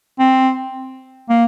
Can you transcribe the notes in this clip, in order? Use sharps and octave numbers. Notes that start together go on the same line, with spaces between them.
C4
A#3